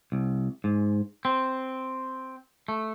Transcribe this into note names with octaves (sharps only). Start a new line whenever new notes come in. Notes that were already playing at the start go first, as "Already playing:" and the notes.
C2
G#2
C4
A3